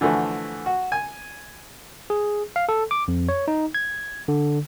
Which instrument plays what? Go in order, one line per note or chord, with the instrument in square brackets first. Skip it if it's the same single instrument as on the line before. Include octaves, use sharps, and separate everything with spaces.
[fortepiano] D3 E3 F3 A3 F#4
F#4
G#5
[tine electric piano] G#4
F5
A4
D6
F2
C#5
D#4
G#6
D3